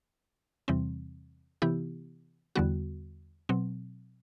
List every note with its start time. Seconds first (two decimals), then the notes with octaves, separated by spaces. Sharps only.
0.68 E2 C3 E3 G3 C4
1.62 C3 E3 B3 E4 G4
2.55 E2 D3 G3 B3 F#4
3.49 B2 F#3 C4